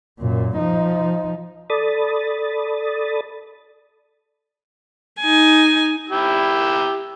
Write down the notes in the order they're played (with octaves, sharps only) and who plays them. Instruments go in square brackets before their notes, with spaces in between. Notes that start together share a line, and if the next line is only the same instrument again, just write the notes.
[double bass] F#2 A#2
F3 D#4
[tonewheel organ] A4 D5 B5 D#6 A6
[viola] D#4 G#5
[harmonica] E4 G4 E6